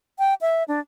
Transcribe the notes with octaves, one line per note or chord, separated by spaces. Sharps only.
G5
E5
D4